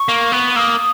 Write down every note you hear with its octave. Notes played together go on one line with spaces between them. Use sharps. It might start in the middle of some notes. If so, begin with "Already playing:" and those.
Already playing: C#6
A#3
B3
A#3 D#6 E6